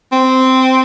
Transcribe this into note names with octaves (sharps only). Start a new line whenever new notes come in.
C4